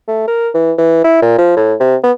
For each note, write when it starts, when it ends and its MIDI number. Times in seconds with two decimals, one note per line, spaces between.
0.08 0.24 57
0.27 0.49 70
0.54 0.72 52
0.78 1.00 52
1.04 1.20 64
1.22 1.38 46
1.38 1.54 53
1.56 1.74 45
1.80 1.96 48
2.04 2.12 59